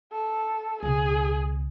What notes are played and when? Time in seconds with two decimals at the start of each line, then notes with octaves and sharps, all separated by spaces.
0.12 A4
0.83 C#2 B2 G#4